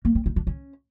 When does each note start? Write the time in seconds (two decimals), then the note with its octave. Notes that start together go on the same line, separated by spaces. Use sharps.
0.05 A#3
0.15 C4
0.26 D#4
0.36 D4
0.47 C#4